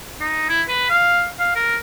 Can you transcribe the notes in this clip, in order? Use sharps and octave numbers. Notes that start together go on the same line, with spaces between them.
D#4
E4
B4
F5
F5
A#4